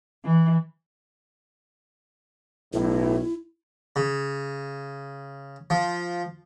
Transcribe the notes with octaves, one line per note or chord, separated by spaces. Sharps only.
E3
B1 A2 E4
C#3
F3